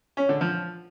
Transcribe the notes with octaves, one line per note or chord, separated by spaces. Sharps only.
C#4
D3
F3